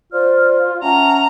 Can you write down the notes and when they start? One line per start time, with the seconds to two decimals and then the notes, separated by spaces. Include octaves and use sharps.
0.12 F4 C5 D5 F6
0.83 C#4 E5 F#5 A5 A#5